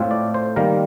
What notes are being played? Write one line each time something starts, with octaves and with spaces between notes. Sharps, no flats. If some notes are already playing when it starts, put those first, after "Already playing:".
Already playing: A2 A3 C4 F4
D5
C5
D#3 G3 A#3 A#4